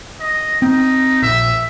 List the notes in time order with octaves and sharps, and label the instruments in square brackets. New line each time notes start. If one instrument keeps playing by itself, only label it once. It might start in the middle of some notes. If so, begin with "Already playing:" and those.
[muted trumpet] D#5
[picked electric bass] C4 [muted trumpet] D#4
[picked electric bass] A#1 [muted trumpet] E5